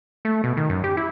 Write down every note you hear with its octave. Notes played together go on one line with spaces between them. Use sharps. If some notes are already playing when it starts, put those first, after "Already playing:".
A3
B2
D#3
F#2
G4
E4